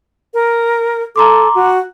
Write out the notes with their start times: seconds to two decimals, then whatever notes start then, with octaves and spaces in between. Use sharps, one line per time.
0.34 A#4
1.16 A4 A#5 C6 D6
1.55 F#4